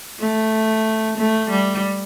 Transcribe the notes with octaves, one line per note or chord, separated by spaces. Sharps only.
A3
A3
G3